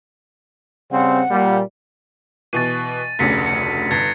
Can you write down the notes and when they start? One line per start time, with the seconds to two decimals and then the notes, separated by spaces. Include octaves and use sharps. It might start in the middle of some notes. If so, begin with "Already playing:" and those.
0.92 C#3 G3 C4 F#5
1.31 A#2 G3
2.53 B2 E3 A6 D#7
3.19 F1 D2 C#3 A#6 B6 C#7
3.46 C#7
3.91 G1 G#6 A6 C7